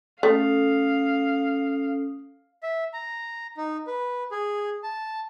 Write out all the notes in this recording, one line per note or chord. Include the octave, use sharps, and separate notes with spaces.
A3 C#4 A4 F5 D#6
E5
A#5
D#4
B4
G#4
A5